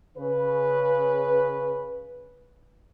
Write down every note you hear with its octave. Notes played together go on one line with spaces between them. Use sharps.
C#3 B4